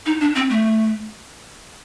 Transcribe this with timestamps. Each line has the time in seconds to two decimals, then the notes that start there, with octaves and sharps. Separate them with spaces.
0.06 D#4
0.21 D4
0.35 C4
0.50 A3